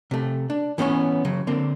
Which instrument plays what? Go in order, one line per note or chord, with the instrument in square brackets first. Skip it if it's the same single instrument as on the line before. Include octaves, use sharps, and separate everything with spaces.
[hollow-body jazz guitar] C3 A3
D4
E3 B3 C#4 A#4 C#5
C#3 F#3
D3 A#3 C4